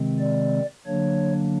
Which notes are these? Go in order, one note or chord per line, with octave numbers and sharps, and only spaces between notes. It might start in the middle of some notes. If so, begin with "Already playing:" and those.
Already playing: C3 D#3 G#3 C4
D5
D3 F#3 A#3 D4 C#5